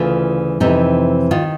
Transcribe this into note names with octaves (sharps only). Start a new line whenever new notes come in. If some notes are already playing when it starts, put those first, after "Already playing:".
Already playing: D2 C#3 E3 F4
F2 C3 E3 D#4
D#3 F4